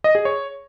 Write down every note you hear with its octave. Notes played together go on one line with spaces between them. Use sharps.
D#5
G#4
C#5